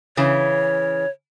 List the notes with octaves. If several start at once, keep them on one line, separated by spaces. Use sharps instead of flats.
C#3 E3 C#5